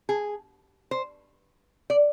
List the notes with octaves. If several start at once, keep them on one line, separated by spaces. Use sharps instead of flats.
G#4
C5
D5